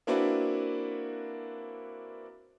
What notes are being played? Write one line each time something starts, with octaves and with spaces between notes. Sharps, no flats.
A#3 C4 D4 E4 F#4 B4